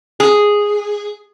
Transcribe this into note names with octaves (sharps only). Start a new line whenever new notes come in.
G#4